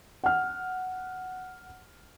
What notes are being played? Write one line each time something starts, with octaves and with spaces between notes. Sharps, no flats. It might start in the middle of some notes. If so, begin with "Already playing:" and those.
F#5 F6